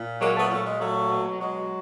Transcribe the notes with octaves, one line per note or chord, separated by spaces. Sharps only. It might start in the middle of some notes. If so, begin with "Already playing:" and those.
Already playing: A#2
F#3 G#3 A#3
A3 B3
A#2 A3
G#3
F#3 A3
B2
F#3 G#3